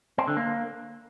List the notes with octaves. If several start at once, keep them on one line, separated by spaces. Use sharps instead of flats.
C4
D3
A#3